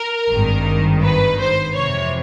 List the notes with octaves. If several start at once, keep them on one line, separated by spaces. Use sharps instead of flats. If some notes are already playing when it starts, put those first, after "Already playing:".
Already playing: A#4
G#1 G2 D#3
B4
C5
F2 C3 E3 C#5